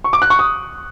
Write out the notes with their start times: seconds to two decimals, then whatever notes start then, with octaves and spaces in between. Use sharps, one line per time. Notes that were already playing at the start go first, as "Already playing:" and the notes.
0.04 C#6
0.13 D6
0.22 F#6
0.30 C#6
0.39 D#6